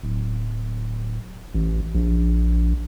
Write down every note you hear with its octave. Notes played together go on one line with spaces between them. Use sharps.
D1
A1
A#1